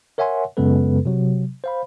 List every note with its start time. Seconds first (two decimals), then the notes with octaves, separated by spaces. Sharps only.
0.18 A#4 C#5 E5 F#5 G#5 C6
0.57 F#2 C#3 G#3 B3 A4 B4
1.06 C3 F#3
1.64 C5 F5 B5